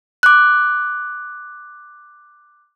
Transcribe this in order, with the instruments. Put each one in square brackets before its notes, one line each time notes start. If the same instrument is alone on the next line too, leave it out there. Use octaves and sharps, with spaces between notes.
[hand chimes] D6 F#6